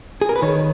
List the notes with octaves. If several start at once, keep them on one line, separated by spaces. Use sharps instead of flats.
G#4
A#4
B4
D#3 C#5